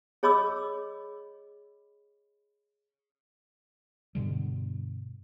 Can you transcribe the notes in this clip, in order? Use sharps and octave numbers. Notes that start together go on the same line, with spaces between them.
G#4 C#5 D#5 B5 D6 E6
G2 B2 D3 G3